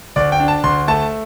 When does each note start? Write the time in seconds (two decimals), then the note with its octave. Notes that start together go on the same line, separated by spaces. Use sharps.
0.16 D2 D5
0.32 G5
0.40 D4
0.48 A5
0.64 D2 C6
0.88 A3 A5